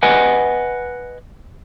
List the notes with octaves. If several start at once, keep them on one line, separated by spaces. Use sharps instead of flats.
B4 D#5 F#5 G#5